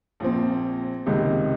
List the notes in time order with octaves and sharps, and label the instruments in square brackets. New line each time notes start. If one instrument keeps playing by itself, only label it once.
[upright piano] A#1 A#2 F3 C4
C#2 C3 D#3 G#3